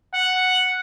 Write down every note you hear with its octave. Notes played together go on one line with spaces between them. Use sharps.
F#5